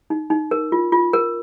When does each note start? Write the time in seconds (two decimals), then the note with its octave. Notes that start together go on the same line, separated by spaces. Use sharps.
0.10 D#4
0.30 D#4
0.51 A#4
0.72 F4
0.92 F4
1.13 A#4